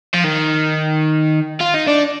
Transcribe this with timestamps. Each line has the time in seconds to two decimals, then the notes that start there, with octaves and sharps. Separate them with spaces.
0.14 F3
0.24 D#3
1.61 F4
1.75 D#4
1.88 D4